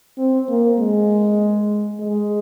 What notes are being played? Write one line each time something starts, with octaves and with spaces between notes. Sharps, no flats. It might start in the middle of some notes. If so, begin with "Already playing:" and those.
C4
A#3
G#3
G#3